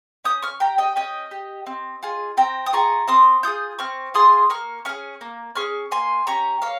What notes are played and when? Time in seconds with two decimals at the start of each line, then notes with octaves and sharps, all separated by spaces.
0.24 C#4 D#6 G6
0.42 C#6 F6
0.60 G4 G5 A#5
0.78 D#5 G5
0.96 C#4 D#5 G5
1.31 G4
1.66 C4
2.03 F4 G#4
2.37 C4 G5 A#5
2.66 D#6
2.73 F4 G#4 A#5 C#6
3.08 C4 C6 D#6
3.43 F4 G#4 D#6 G6
3.79 C4 C#6 F6
4.14 F4 G#4 C6 D#6
4.50 A#3 C#6 F6
4.85 C#4 G#4 C#6 F6
5.21 A#3
5.55 C#4 G#4 C#6 F6
5.91 A#3 G#5 C6
6.27 C#4 G4 A#5 C#6
6.62 A#3 C#5 F5